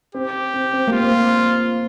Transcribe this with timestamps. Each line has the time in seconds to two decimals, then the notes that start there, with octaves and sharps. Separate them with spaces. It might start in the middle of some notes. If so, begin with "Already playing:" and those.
0.14 C4 G4
0.54 C4
0.73 C4
0.87 A#3
0.93 F4
1.01 C4